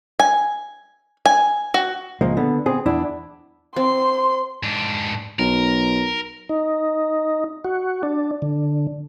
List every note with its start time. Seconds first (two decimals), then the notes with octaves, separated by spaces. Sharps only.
0.19 G#5
1.26 G#5
1.74 F#4
2.21 C#2 F3 G#3 A#3
2.37 D3 B3
2.66 B3 C4 G#4
2.86 E2 D4 E4
3.76 C4 C6
4.63 G#2 D4
5.39 B1 A#4
6.49 D#4
7.65 F#4
8.03 D4
8.42 D3